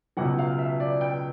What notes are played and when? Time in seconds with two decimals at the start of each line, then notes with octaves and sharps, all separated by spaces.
0.17 C#2 B2 F#3 F#5
0.39 F5
0.59 E5
0.80 D5
1.01 G5